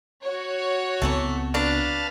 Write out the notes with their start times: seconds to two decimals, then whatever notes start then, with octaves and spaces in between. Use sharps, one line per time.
0.24 F#4 C#5
1.02 C#2 E3 F#3 A3 B3 C4
1.54 F#3 D4 B4 F5 A5